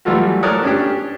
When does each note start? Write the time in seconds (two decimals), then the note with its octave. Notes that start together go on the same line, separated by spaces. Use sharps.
0.05 E3 F#3 G3 A3 F4 F#4
0.43 A4 A#4 C#5 D5 D#6 F#6
0.63 C#4 D4 G4